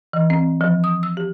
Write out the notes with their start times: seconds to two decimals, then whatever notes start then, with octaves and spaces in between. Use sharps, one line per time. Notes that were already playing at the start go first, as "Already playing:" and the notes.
0.13 E3
0.30 C4
0.61 F3
0.84 D#6
1.03 E6
1.17 G4